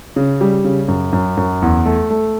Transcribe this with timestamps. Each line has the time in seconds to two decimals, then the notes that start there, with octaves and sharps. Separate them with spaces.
0.16 C#3
0.41 G3
0.65 C#3
0.88 F#2
1.13 F#2
1.37 F#2
1.62 E2
1.86 A3
2.10 A3